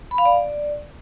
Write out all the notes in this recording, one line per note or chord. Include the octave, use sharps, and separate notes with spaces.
B5
F5
D5